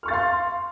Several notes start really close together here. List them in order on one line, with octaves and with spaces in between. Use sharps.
F6 C#6 A6 F5 C6